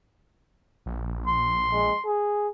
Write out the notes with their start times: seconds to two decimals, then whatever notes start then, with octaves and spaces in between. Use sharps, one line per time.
0.86 A#1
1.26 C6
1.72 G#3
2.05 G#4